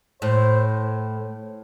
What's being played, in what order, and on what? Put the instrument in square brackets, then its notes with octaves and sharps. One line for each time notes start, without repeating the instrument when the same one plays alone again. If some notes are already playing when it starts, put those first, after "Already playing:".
[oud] A2 [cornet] C5